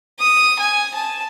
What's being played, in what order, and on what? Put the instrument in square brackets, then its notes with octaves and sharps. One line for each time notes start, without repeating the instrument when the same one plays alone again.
[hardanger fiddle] D#6
G#5
A5